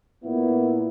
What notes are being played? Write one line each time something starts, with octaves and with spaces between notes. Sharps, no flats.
A#2 B3 E4